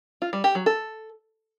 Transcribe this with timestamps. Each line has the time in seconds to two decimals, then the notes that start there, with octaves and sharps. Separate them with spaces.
0.22 F4
0.33 G3
0.44 G4
0.55 F#3
0.66 A4